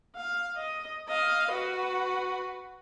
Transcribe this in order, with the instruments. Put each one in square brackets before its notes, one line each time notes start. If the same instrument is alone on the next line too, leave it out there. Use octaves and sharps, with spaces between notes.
[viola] F5
D#5
D#5 F5
F#4 B4